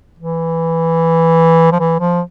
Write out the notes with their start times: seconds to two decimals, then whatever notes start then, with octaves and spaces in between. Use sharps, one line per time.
0.19 E3
1.72 F3
1.80 E3
2.00 F3